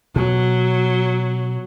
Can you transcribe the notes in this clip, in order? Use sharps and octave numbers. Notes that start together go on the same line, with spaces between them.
B2 F#3